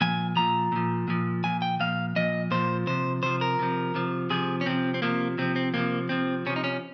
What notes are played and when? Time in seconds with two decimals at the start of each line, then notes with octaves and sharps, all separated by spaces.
0.01 A#2 F3 G#5
0.36 A#2 F3 A#5
0.72 A#2 F3
1.08 A#2 F3
1.44 A#2 F3 G#5
1.62 G5
1.80 A#2 F3 F5
2.16 A#2 F3 D#5
2.51 A#2 F3 C5
2.87 C3 F3 C5
3.23 C3 F3 C5
3.41 A#4
3.59 C3 F3
3.95 C3 F3
4.30 C3 F3 G#4
4.61 C#4
4.66 C3 F3 C4
4.94 C4
5.02 C3 F3 A#3
5.38 C3 F3 C4
5.56 C4
5.74 C3 F3 A#3
6.09 C3 F3 C4
6.46 C3 F3 C#4
6.56 D#4
6.64 C#4